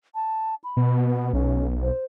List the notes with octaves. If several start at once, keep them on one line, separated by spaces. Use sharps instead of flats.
A5
B5
B2
B3
B1 C#4
C5